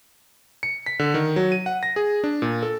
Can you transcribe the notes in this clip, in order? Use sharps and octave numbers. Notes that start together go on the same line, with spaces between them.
C#7
B6
D3
D#3
F#3
D#7
F#5
A#6
G#4
D4
A#2
A4